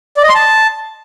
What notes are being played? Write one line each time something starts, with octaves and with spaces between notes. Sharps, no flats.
D5
D#5
C6
A5